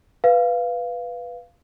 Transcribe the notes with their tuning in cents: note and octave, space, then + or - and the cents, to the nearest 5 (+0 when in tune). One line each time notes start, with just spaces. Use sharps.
B4 +0 F5 -10